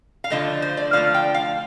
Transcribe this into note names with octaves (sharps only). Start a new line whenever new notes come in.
F5
D3 F3 A3 D#5
C5
D5
D3 F3 A3 F5
G5
F5